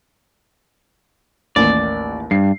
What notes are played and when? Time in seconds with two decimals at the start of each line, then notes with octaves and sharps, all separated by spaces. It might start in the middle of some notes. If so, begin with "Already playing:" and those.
1.56 A1 D#2 D5
2.31 G2 C7